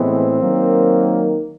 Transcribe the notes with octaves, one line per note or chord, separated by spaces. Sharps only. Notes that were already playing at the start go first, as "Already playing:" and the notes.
Already playing: A2 E3 G#3 B3 C4
D#3 F#3 A#3